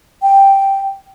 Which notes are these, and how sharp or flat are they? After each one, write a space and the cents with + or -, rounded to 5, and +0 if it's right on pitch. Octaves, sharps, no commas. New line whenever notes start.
G5 +0